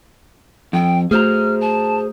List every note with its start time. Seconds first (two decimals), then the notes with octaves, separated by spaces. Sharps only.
0.73 F2 G5
1.11 A3 F#4 G#4 C5 A#5 F6
1.61 A5